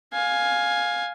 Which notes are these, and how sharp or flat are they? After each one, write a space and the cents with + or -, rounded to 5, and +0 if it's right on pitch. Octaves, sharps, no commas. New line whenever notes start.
F5 +15 G#5 +0